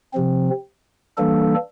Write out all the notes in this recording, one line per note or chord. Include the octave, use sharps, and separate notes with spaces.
C3 F3 C4
E3 G3 A#3 D4 A4